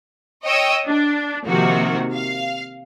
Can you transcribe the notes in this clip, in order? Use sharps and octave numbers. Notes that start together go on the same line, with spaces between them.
C#5 D#5 G5 D#6 E6
D4
C3 D#3 F3 A#3 F#4
F5